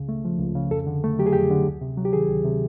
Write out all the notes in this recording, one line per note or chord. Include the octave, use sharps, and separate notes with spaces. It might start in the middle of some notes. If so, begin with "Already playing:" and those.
Already playing: C#2 C#3
A3
F3
C#2
C#3
F2 A4
D3
A3
F#3 G4
G#4
F2 G4
D3
D2
C3
F#3
G4
D#3 G#4
D2
C3